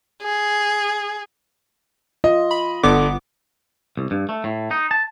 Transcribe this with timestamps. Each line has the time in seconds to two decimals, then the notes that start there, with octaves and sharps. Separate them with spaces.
0.23 G#4
2.24 F4 D#5
2.51 B5
2.83 G1 D3 B3 D6
3.97 C2
4.11 G2
4.29 A3
4.44 A2
4.71 D#4
4.91 A5